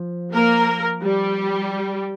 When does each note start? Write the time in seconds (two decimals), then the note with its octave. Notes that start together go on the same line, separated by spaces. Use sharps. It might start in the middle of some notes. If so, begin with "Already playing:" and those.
Already playing: F3
0.33 A#3 A#4
1.03 G3 G4